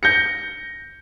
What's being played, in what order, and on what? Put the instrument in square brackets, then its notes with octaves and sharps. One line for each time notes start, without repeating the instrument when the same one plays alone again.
[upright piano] G6 A#6 C#7